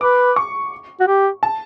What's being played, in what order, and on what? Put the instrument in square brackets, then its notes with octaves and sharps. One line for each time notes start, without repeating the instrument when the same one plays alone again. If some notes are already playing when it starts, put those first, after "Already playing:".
[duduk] B4 [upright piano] D6
[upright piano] C#6
[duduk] F#4
G4
[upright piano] A5